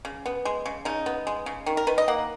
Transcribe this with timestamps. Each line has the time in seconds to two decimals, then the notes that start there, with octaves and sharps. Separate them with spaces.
0.05 C#3
0.26 B3
0.45 G#3
0.66 C#3
0.85 C#3 D#4
1.06 B3
1.27 G#3
1.46 C#3
1.66 D#3
1.77 A#4
1.87 D#3 B4
1.98 D#5
2.08 A#3 F#5